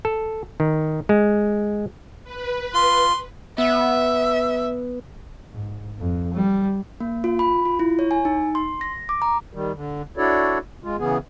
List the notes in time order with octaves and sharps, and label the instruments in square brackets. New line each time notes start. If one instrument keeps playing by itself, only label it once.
[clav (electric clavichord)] A4
D#3
G#3
[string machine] B4
[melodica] F4 [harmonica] C6
[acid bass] B3 [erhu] E5
[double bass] G#2
F2
G3
[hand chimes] A#3
F4
B5
F4
E4
C#5
G#5
D#4
C6
A#6
D6
A#5
[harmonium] D#3 G3
D3
D4 E4 F#4 A4 C#5 D5
G#3 F4
C#3 E3 B3 G#4